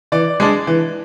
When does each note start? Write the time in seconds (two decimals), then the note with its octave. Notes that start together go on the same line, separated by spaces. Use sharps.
0.12 E3 D5
0.40 G#3 D4
0.67 E3